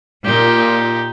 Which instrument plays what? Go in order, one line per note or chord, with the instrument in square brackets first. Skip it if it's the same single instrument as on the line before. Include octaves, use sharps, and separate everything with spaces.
[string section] A#2 [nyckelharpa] D#4 G4